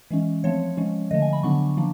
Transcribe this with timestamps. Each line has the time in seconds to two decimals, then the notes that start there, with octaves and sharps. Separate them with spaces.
0.11 E3 G#3 C#4
0.44 F3 A3 C4 C#5
0.77 F3 G#3 C#4
1.11 D3 F3 A3 D#5
1.22 G#5
1.33 B5
1.43 D3 F#3 B3 D4 C#6
1.77 F3 A#3 D4